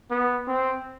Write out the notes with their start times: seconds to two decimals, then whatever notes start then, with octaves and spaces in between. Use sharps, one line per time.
0.11 B3
0.48 C4